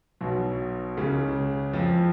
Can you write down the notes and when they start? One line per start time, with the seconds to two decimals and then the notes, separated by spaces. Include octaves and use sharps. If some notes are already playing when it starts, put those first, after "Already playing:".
0.21 B1 B2
0.97 C#2 C#3
1.73 F2 F3